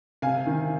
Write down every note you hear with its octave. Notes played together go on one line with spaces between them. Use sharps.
C3 F5 G#5
D#3